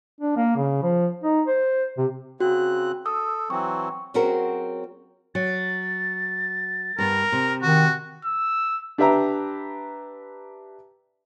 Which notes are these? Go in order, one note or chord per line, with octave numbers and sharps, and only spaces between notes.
D4
A#3
C#3
F3
D#4
C5
C3
C#3 C4 F#4 F#6
A4 D#6 E6
E3 F#3 C4 C#6
F#3 C4 C#4 F#4 G#4 A#4
F#3 A6
G2 B3 A#4
C3
D#3 F#4
E6
D4 G4 B4 E5 G5 A#5